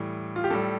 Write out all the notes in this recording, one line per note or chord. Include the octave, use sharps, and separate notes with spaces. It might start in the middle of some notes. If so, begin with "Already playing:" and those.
Already playing: A2 E3 G3
F4
G4
A2 G3 A4